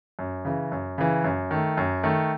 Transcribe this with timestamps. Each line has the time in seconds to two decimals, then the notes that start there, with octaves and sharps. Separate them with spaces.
0.19 F#2
0.45 C#3 E3
0.72 F#2
0.98 C#3 E3
1.24 F#2
1.51 D#3 A3
1.77 F#2
2.03 D#3 A3